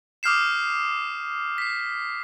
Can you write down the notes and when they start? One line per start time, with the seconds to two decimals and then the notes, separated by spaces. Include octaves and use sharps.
0.23 D6 D#6 F6 G6 C7 E7
1.58 B6 C7